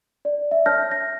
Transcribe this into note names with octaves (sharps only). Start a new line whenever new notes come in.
D5
E5
C#5 A5 F6 G6 A#6
A#6